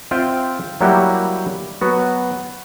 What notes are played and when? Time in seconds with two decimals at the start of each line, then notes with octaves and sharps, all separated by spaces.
0.11 C4 F4 E5 F5 G5
0.81 F#3 G3 A#3 E4 F#4 G4
1.81 F#3 B3 F#4